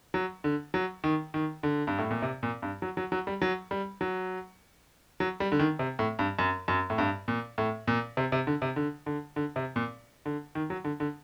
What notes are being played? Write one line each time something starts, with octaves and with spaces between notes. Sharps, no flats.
F#3
D3
F#3
D#3
D#3
D3
G2
A2
A#2
C3
A#2
G2
F#3
F#3
F#3
G3
F#3
G3
F#3
F#3
G3
D3
D#3
C3
A2
G2
F#2
F#2
A2
G2
A#2
A2
A#2
C3
C3
D3
C3
D3
D3
D3
C3
A#2
D3
D#3
F#3
D3
D3